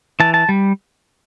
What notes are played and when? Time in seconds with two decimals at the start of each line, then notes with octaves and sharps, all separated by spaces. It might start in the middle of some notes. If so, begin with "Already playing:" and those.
0.20 E3 A5
0.34 A5
0.49 G3